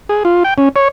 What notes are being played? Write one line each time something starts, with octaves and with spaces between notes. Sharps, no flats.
G#4
F4
G5
C#4
C#5